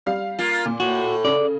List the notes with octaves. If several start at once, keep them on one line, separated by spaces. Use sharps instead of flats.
G3 F5
A#3 F4
A#2
A2 F#4
C#3 D5